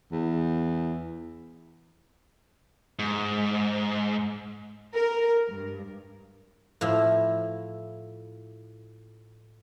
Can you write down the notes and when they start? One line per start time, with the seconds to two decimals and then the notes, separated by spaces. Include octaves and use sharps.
0.12 E2
2.99 G#2
4.94 A#4
5.48 G2
6.81 A2 F3 E4